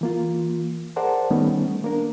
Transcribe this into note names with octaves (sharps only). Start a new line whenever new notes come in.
E3 A#3 F4
G#4 A#4 C5 D5 F#5 A5
D#3 G3 A3 B3 C#4 D#4
A#3 D4 A#4